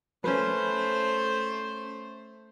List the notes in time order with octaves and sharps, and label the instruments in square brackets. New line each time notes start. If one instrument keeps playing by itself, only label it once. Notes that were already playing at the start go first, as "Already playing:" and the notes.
[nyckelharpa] A3 C5 [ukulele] C#4 B4